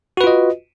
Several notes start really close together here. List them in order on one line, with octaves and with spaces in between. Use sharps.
F#4 B4 F4 D#5